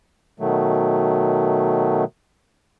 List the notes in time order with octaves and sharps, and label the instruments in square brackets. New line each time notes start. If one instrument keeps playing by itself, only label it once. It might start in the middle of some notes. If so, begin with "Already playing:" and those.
[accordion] B2 D#3 F#3 A3